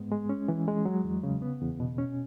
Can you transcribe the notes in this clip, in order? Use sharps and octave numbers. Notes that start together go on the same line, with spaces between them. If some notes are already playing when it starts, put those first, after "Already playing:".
Already playing: G#2 G#3 B3
G#3
C#4
E3
G#3
F#3
E2
C#3
B3
E2
B2
C#4